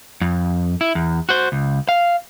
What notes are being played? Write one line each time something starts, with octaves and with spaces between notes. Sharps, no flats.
F2
E4
E2
F#4 C5
C#2
F5